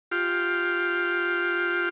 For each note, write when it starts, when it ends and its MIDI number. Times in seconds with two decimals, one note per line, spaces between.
0.12 1.89 65
0.12 1.89 67